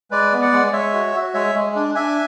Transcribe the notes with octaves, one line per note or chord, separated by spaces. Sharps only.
G#3 B4 D5
B3
D5 F#5
G#3
G#3 C#5 E5
F#4
F#4
G#3 C#5 E5
G#3
D4
D4 E5 G#5